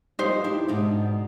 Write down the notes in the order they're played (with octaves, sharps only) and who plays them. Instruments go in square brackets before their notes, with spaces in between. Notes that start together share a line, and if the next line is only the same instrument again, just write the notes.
[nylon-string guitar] F3 G3 G4 [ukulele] D#4 C5
[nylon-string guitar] D4 E4 G4
G#2 B2 D4